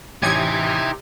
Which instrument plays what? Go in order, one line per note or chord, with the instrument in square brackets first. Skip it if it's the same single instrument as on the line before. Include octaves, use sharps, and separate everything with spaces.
[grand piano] A1 [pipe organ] C3 D#4 G4 [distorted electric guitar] E4 G#5 [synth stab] G#6